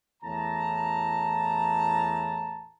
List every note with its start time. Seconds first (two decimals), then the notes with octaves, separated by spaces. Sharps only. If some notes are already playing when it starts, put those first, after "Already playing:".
0.22 E2 A2 A5 A#5